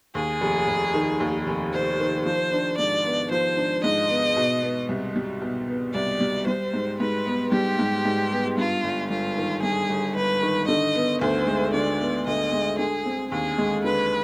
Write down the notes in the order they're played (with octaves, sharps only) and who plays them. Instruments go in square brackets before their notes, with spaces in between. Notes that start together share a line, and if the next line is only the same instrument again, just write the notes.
[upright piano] D#2 [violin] G#4
[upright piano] F1
F1
D#3
D#2
F1
[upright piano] F1 [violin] C5
[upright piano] D#3
[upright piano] F3 [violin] C5
[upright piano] D4
[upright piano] G#2 [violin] D5
[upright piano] B3
[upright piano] F3 [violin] C5
[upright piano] D4
[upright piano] G#2 [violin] D#5
[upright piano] B3
B2
B3
C2
G3
B2
B3
[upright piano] C2 [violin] D5
[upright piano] G3
[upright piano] G3 [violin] C5
[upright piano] G#2
[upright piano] G#2 [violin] B4
[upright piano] B3
[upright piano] G3 [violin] G4
[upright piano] G#2
G#2
B3
[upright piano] G2 [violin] F4
[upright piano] G1
[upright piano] G1 [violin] F4
[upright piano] D#3
[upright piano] G2 [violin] G#4
[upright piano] G1
[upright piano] G1 [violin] B4
[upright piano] D#3
[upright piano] D3 [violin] D#5
[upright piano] B3
[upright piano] D2 [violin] C5
[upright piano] G#3
[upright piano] D3 [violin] D5
[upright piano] B3
[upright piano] D2 [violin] D#5
[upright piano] G#3
[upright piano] D3 [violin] G#4
[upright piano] C4
[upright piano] D#2 [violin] G#4
[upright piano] G#3
[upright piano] D3 [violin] B4